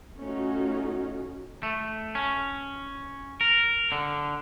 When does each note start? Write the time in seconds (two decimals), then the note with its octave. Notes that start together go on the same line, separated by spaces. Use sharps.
0.19 A3 C#4 D#4 F4 F#4
1.63 A3
2.15 C#4
3.41 A#4
3.92 D3